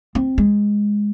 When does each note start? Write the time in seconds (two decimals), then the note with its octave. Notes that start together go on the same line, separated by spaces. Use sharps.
0.15 C4
0.38 G#3